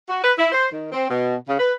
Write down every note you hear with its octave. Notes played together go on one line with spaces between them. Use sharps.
F#4
B4
E4
C5
D#3
C4
B2
C#3
B4